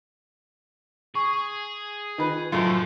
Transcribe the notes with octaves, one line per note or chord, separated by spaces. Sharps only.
G#4 C#6
D#3 F4 B4 D#5
F#2 A2 F3 A3 F4 B4 C6